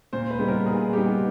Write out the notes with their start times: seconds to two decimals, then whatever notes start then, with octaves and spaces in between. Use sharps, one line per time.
0.13 A#2 C5
0.31 B4
0.39 G3 B3 D#4
0.48 A#4
0.66 A#2 G#4
0.93 G3 B3 D#4 G4